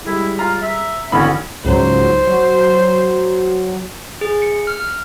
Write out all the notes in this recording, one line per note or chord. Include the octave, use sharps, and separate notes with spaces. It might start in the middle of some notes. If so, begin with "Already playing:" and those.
G3 G#3 E4
F4 A#5
E5
G#1 D3 E3 B3 C#4 B5
C#2 G#2 F#3 C5
F#3
G#4
C#7
F6